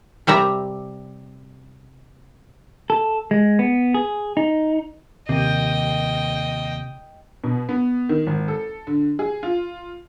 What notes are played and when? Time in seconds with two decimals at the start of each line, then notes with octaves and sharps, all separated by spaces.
0.27 C3 G3 E5 A#5
2.90 A4
3.31 G#3
3.59 B3
3.94 G#4
4.37 D#4
5.29 D#2 C3 D#5 G5
7.44 B2
7.69 B3
8.09 D#3
8.27 G#1
8.48 A4
8.87 D3
9.19 G#4
9.43 F4